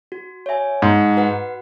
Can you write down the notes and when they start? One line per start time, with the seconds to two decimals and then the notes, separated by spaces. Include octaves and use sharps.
0.12 F#4
0.46 C#5 E5 G#5
0.82 G#2 D#4
1.17 F#4 B4 F#5